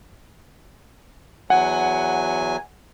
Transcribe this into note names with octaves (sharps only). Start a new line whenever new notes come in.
E2 F#3 F#5 G#5